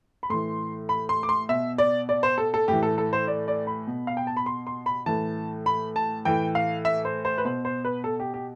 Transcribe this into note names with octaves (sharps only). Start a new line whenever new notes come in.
B5
A2 E3 C6
B5
C6
D6
C6
B2 E5
D5
D5
C5
A4
A4
A2 E3 G4
A4
A4
C5
D5
D5
B5
B2
F5
G5
A5
B5
C6
C6
B5
A2 E3 A5
B5
A5
A2 E3 G5
F5
E5
C5
C5
B4
B2 C5
C5
B4
A4
G4
G4